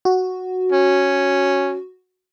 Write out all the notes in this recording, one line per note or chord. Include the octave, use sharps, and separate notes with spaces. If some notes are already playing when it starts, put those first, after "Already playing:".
F#4
C#4